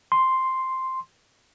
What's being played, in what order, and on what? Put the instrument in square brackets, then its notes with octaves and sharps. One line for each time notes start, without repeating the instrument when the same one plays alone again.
[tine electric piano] C6